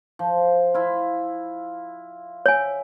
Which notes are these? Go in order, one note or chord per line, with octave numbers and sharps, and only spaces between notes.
F3
E4 F4
C#5 E5 G#5